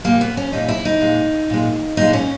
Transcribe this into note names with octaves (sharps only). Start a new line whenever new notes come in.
A#2 G3 A#3
B3
C#4
A#2 G3 D#4
E4
D#4
A#2 G#3
A#2 G#3
A#2 G#3 D#4
C#4